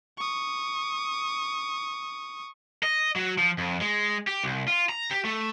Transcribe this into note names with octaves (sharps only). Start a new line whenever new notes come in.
C#6 D#6
D#5
F#3
F3
F2
G#3
G4
C2
F4
A#5
G4
A3